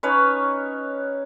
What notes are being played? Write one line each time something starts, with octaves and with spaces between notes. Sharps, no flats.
C#4 D#4 B4 C#5